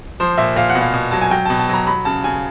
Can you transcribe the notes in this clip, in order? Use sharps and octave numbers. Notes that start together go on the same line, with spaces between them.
F3 C5
A#2 E5
A#2 F5
F#5
B2
F5
B2
F#3 A5
G#5
F#3 G5
B2 A5
A5
F#3 A#5
F#3 B5
C#3 A5
C#3 G#5